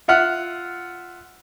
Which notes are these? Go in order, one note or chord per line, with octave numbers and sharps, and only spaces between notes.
F4 E5 F#5 F6 F#6